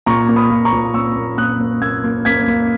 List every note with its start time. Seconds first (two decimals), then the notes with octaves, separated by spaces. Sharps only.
0.06 A#2 A#5 C#6
0.29 A#3
0.36 B5 D#6
0.50 A#2
0.65 A#5 C#6
0.72 A#2
0.94 A#3 C#6 E6
1.16 A#3
1.38 A#2 D#6 F#6
1.60 A#3
1.82 A#3 E6 G#6
2.04 A#3
2.25 A#3 G#6 B6
2.48 A#3